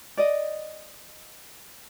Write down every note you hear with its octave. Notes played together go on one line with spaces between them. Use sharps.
D5 D#5